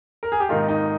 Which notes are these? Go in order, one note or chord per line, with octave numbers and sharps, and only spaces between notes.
A#4
G#4
G4
G#1 G#2 D#3 A#3 D#4 F4
D#4